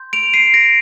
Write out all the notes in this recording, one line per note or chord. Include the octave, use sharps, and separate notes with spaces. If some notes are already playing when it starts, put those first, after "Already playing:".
Already playing: C6 G6
D7 F7
C7 D#7
A#6 D7